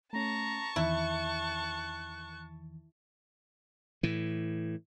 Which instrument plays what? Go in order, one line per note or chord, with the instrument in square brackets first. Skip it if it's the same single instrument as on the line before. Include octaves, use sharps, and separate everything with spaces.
[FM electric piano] A3 C#4 [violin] A5 C#6 [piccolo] A#5
[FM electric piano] E2 D#3 E3 [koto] E4 [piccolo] F#6
[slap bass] A2 E3